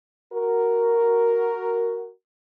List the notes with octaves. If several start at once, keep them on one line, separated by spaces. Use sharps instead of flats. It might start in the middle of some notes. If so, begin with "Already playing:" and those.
F#4 A#4